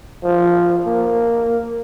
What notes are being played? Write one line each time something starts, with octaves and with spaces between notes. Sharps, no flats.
F3
A#3